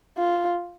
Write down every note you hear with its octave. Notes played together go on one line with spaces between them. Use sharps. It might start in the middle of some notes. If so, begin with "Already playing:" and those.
F4